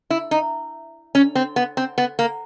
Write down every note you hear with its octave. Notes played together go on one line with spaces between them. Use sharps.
E4
D#4
C#4
C4
B3
C4
B3
A#3